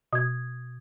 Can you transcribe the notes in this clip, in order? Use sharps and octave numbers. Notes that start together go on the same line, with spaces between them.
B2 D#6 G#6